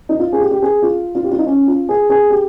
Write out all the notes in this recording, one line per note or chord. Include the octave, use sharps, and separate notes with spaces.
D#4
F4
G#4
G4
G4
G#4
F4
F4
G4
F4
D#4
C#4
F4
G#4
G#4
G4